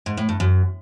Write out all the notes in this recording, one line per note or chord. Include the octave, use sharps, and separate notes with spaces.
G#2
A2
G2
F#2